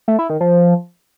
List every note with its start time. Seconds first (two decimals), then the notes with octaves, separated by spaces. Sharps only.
0.08 A3
0.19 E4
0.30 D#3
0.41 F3